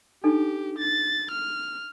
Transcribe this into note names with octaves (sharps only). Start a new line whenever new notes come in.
D4 D#4 G4 A4
A6
F6